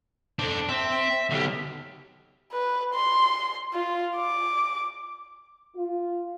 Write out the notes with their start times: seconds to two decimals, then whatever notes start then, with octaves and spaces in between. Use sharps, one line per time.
0.39 C4 D4 A4
0.69 C4 E5
1.31 B1 D3 G4
2.52 B4
2.94 C6
3.73 F4
4.16 D6
5.76 F4